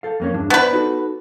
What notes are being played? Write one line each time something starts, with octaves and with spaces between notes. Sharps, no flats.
A4 F5
F2 A#3 C#4
E2 G2 D4
B3 B4 C5 D5
D#4 F#4 A4